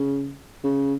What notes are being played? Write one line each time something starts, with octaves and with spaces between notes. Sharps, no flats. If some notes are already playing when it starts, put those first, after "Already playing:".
Already playing: C#3
C#3